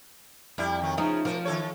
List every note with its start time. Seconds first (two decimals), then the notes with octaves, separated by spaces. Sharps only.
0.58 F2 G3 E4
0.81 D#3 F#3
0.98 C#3 F3 D#4
1.25 B2 F3 A#4
1.45 D#3 A4 C#5